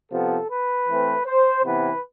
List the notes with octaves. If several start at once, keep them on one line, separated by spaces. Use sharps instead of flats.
C3 F3 B3 A4
B4
E3 A3 C4
C5
C3 E3 B3 B4